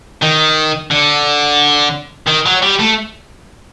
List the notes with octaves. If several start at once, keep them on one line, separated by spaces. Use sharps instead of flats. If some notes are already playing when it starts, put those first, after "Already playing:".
D#3
D3
D#3
F#3
G3
A3